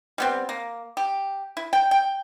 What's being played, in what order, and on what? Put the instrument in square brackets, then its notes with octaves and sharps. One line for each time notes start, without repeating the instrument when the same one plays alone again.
[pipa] G3 B3 C4
A#3
G4
E4
G5
G5